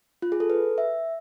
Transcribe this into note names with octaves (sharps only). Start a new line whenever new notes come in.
F4
G#4
A4
B4
E5